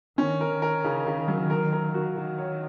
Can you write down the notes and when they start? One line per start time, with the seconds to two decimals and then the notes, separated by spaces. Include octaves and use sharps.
0.18 D#3 C#4
0.41 A#4
0.51 D#3
0.62 A#4
0.84 C#3
1.06 C#3
1.28 F#3
1.50 A#4
1.73 A#4
1.94 F#4
2.16 D#3 F#4
2.38 C#5